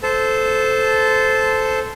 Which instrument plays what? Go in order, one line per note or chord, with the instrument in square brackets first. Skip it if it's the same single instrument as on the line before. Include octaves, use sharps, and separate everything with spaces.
[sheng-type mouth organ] A4 C5 A5